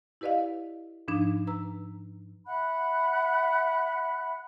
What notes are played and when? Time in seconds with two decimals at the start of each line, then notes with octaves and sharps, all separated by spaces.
0.21 E4 G4 B4 D5 D#5 F5
1.08 G#2 F3 D4 D#4
1.47 B4 A#5 E6
2.46 E5 F#5 B5 F#6